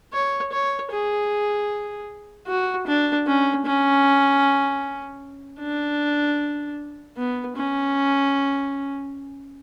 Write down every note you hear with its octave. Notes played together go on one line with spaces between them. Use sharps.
C#5
C#5
G#4
F#4
D4
C#4
C#4
D4
B3
C#4